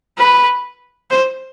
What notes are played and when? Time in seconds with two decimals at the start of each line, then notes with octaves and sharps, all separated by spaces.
0.18 B4
1.11 C5